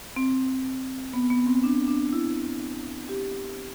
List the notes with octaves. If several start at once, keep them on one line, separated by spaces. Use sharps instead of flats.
C4
B3
B3
C4
D4
D4
E4
G4